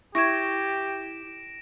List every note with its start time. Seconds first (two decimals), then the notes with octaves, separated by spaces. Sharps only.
0.15 E4 G4 C#6 G#6 A#6 D7 E7